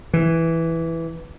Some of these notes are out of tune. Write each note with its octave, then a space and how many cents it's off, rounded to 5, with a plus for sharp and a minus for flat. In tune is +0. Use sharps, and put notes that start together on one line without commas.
E3 +0